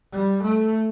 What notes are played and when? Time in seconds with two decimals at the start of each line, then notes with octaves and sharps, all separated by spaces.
0.12 G3
0.43 A3